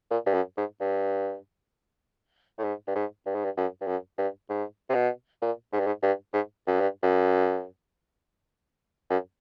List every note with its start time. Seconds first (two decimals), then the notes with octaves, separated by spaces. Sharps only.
0.11 A#2
0.26 G2
0.34 F#2
0.57 G#2
0.80 G2
2.58 A2
2.64 G#2
2.87 G2
2.95 G#2
3.26 G2
3.35 G#2
3.45 G2
3.57 F#2
3.81 G2
3.87 F#2
4.18 G2
4.50 G#2
4.90 C3
4.95 B2
5.42 A#2
5.73 G#2
5.80 G2
5.87 G#2
6.02 G2
6.33 G#2
6.67 F#2
6.80 G2
7.03 F#2
9.10 F#2